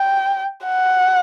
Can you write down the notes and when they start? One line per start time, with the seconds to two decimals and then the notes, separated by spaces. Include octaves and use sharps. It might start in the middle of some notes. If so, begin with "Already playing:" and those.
Already playing: G5
0.66 F#5